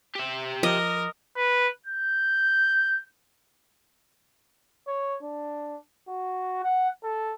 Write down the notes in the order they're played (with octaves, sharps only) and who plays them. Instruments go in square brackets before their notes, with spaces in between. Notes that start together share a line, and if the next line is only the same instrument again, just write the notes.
[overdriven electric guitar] G4 E5
[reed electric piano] F3 D6 [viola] A#4 [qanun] D#5
[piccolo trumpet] B4
G6
[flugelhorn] C#5
D4
F#4
F#5
A4